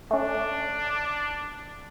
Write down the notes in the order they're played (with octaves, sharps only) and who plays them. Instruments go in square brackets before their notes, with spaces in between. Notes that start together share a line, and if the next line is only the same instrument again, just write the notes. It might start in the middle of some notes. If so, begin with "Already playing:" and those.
[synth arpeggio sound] A3 C#4 [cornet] D4